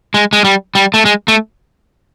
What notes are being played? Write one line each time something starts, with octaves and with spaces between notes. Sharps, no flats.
G#3
G#3
G3
G3
A3
G#3
A3